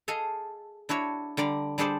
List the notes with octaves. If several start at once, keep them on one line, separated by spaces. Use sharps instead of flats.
G#4 A4 D#5 F5
D4 E4 F#4 C#5
D3 G3 D5 A#5
G3 D4 G#4 A4 C5 D5